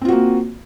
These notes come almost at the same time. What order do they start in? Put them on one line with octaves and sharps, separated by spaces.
C4 F4 F#4 A#3